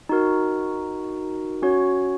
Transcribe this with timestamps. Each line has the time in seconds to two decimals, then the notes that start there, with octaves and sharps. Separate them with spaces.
0.09 D#4 F#4 A#4
1.62 C#4 F#4 C#5